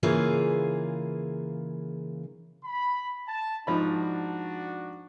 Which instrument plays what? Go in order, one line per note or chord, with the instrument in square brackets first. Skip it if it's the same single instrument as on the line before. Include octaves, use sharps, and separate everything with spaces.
[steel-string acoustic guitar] C#3 E3 A#3 F4 G#4 B4
[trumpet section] B5
A5
[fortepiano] G#2 F3 B5 [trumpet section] D4 F#4